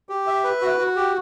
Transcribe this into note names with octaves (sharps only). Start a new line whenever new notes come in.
G4
E5
B4
F#4
F#4
G4